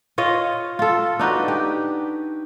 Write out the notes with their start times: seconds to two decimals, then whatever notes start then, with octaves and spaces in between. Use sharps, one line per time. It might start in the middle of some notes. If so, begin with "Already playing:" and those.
0.18 F4 C#5 D#5
0.79 F4 A4
1.19 D4 D#4 F#4 B4
1.48 G4